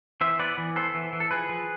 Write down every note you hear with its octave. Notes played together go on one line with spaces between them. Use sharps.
E3 C5 E5
B3 B4 D5
E3
B3 A4 C5
E3
E3
A4
F3 G#4 B4
F3